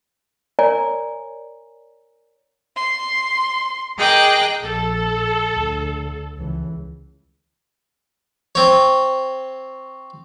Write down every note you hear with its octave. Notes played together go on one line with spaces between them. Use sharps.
A#4 C#5 D5 G#5 A#5
C6
G#4 A#4 D#5 G5 D6 F#6
A#1 A4
D2
C#2 E3
C4 C#5